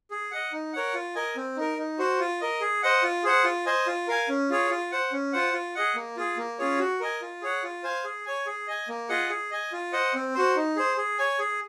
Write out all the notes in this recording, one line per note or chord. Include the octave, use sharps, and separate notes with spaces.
G#4
D#5 F#5
D#4
A#4 C#5 F#5
F4
A#4 D#5 G#5
C4
D#4 A#4
D#4
F#4 C5
F4
A#4 D#5
G#4
C5 D#5 F#5
F4
G#4 C5 F#5
F4
C5 D#5 G#5
F4
A#4 F5 G#5
C#4
F4 G#4 C#5
F4
C5 F#5
C#4
F4 C5 F#5
F4
G#4 D#5 F#5
A#3
F4 G#4
A#3
C#4 F4 G#4 C#5
F#4
A#4 D#5 G#5
F4
G#4 C#5 F#5
F4
C5 F5 G#5
G#4
C#5 G#5
G#4
D#5 G#5
A#3
F4 G#4 D#5 F#5
G#4
D#5 G#5
F4
C5 D#5 F#5
C4
F#4 C5
D#4
G#4 C5
G#4
C#5 G#5
G#4